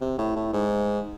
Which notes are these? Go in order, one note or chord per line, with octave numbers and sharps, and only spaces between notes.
C3
A2
A2
G#2